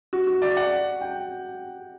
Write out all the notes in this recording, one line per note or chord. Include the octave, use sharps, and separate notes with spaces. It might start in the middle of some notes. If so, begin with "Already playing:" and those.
F#4
F#4
D5
F#5
G5